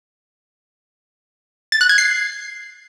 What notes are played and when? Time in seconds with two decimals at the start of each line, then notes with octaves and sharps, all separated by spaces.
1.72 A6
1.81 F#6
1.89 G#6
1.98 C7